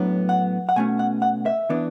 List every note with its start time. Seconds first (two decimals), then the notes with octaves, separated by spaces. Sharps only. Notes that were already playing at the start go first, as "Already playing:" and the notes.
Already playing: A2 F#3 B3 D4
0.29 F#5
0.69 F#5
0.76 B2 A3 C#4 G#5
0.99 F#5
1.22 F#5
1.46 E5
1.69 E3 B3 D4